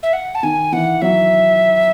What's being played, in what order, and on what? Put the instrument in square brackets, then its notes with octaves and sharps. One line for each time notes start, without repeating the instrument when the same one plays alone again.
[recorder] E5
F#5
A5
[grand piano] D#3 [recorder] G#5
[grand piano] E3 [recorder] F#5
[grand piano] F#3 [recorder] E5